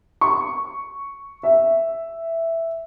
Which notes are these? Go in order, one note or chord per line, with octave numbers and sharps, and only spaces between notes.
C#6
E5